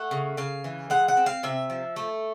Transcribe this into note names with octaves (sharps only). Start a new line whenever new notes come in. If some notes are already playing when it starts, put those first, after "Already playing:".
Already playing: A3 F#5
C#3
C#3 F5
E3
G#3 F#5
F#5
C4
F5
C3 E5
F3
A3